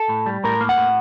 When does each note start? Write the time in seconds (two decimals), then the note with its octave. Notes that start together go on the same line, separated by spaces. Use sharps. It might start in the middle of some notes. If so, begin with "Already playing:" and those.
Already playing: A4
0.09 A2
0.26 G3
0.44 A2 A#4
0.61 A#3
0.69 F#5
0.77 A2